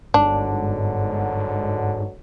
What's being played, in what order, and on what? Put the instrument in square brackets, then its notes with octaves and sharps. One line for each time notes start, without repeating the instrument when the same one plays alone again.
[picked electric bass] G1 [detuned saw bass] G#2 [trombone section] B2 D3 F#3 [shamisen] D4